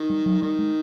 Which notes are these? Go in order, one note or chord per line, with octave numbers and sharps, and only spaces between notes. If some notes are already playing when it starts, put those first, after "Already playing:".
Already playing: D#3
G3
F#3
D#3 G3
G#3